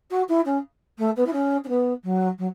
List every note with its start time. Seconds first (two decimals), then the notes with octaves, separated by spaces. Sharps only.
0.10 F#4
0.28 E4
0.45 C#4
0.98 A3
1.16 B3
1.26 E4
1.33 C#4
1.64 C#4
1.68 B3
2.04 F#3
2.38 F#3